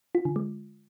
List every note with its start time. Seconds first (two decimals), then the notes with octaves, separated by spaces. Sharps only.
0.15 F4
0.25 D3
0.36 G#3